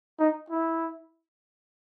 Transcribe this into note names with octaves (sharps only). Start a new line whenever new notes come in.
D#4
E4